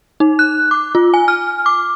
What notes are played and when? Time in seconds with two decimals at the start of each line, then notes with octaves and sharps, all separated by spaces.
0.20 D#4
0.39 F#6
0.71 D6
0.95 F4
1.14 G#5
1.28 F6
1.66 D6